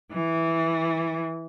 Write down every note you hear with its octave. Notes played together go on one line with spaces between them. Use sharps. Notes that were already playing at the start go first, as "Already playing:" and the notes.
E3